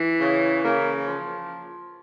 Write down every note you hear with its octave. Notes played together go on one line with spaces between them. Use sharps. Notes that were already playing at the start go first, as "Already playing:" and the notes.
Already playing: E3
C#3
C#3 A#3
F3